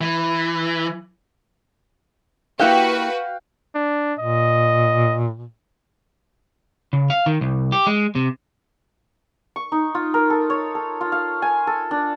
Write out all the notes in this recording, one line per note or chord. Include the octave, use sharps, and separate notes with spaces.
E3
A#3 E4 F#4 G4 B4 F5 G5 F#6
D4
A#2 D#5
C#3
F5
D#3
C2
G4
G#3
C3
C#6
D#4
F4
A#4
A4
C#5
A4
F4
F5
G#5
A4
D4